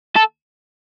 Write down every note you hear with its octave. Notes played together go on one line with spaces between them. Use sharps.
A4